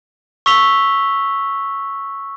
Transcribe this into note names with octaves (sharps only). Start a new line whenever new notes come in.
C#6 E6 B6 F7 G7